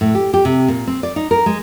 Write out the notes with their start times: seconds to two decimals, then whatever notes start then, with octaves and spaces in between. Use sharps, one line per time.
0.01 A2
0.15 G4
0.34 G4
0.45 C3
0.68 A#2
0.87 C4
1.03 D5
1.16 D#4
1.31 A#4
1.46 G#3